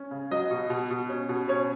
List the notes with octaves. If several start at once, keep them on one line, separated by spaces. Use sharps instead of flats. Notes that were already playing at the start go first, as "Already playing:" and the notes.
Already playing: C#4
C#3
F#3 D#5
B2
B2
B2
C#4
B2
C#4 C#5